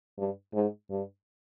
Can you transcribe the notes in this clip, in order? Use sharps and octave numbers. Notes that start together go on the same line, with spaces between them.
G2
G#2
G2